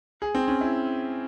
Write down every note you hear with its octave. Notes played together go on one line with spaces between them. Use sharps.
G#4
C4
C#4
E4